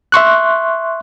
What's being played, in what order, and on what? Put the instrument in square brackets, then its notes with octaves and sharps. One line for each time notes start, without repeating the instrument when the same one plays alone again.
[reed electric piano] E5 C6 C#6 F#6